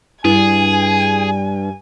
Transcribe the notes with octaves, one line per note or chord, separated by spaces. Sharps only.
G2 E4 G#4 G#5